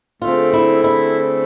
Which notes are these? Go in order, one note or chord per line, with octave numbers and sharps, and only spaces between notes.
D3 A3 C4 F4 G#4
E4
E4